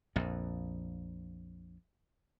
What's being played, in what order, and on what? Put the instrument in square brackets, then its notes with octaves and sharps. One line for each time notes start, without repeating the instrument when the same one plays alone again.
[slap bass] A#1 F2